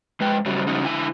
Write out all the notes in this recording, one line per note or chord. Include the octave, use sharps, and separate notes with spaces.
F2 G#3 B4 G5
C#3 F#3 G3
C#3 F3 G3 C#4 D#4 F#4
D3 E4 G5 G#5